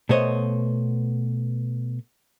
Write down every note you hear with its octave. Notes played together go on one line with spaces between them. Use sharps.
B2 A3 B3 C5 C#5 D#5